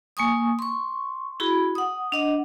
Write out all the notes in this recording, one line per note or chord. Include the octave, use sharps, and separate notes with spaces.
A#3 G#5 C#6 D#6
C6 C#6
E4 F#4 G#4 B5
F#5 D#6
D4 D#5 F#5